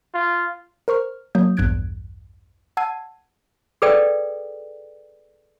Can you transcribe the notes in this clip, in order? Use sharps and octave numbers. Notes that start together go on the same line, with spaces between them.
F4
A#4 C5 C#6 F6
F#3 A#3 D#6 G6
A#1 E2 G2 F#6 G#6 D7
F#5 A5 E6 G#6 C7 D#7
G#4 A4 B4 D5 G5